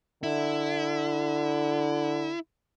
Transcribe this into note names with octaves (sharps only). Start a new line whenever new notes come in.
D3 E4